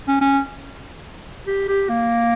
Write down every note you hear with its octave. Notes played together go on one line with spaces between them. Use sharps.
C#4
C#4
G4
G4
A#3